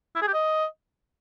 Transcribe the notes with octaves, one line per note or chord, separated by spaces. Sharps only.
E4
G#4
G4
D#5